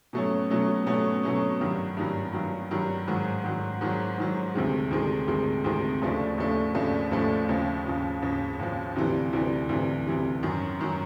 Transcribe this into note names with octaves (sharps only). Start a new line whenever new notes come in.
B2 F#3 A3 C#4
B2 F#3 A3 C#4
B2 F#3 A3 C#4
B2 F#3 A3 C#4
G2 D#3 F#3
G2 D#3 F#3
G2 D#3 F#3
G2 D#3 F#3
G#2 D#3 F#3
G#2 D#3 F#3
G#2 D#3 F#3
G#2 D#3 F#3
D2 C3 D#3 G#3
D2 C3 D#3 G#3
D2 C3 D#3 G#3
D2 C3 D#3 G#3
D#2 C#3 F3 A3 D4
D#2 C#3 F3 A3 D4
D#2 C#3 F3 A3 D4
D#2 C#3 F3 A3 D4
D#2 C#3 F3
D#2 C#3 F3
D#2 C#3 F3
D#2 C#3 F3
D2 C3 E3 G3
D2 C3 E3 G3
D2 C3 E3 G3
D2 C3 E3 G3
F#2 D#3 F#3
F#2 D#3 F#3